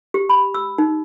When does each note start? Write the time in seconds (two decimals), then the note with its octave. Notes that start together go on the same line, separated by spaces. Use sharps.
0.14 G4
0.29 B5
0.54 E6
0.78 D#4